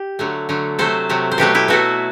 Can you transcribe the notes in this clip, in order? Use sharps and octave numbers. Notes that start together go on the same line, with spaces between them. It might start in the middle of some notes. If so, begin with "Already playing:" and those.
Already playing: G4
D3 F#3 A3
D3 F#3 A3
C3 F#3 A3 A4 C5
C3 F#3 A3
C5
B2 F#3 A3 G4 B4
E4 G4
B2 F#3 A3 F#4 A4